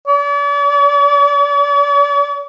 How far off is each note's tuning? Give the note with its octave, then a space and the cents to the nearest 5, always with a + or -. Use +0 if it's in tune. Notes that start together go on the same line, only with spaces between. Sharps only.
D5 -45